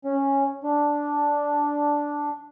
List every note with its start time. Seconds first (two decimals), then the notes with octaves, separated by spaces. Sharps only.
0.05 C#4
0.63 D4